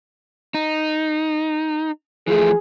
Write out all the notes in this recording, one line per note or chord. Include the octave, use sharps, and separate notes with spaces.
D#4
E3 F3 A3 G#4